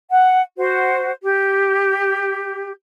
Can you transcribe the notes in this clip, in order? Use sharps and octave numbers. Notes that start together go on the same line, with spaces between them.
F#5
F#4 C5
G4